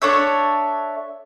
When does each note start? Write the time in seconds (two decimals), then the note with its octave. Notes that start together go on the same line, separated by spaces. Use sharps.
0.02 D4 A4 C#5 E5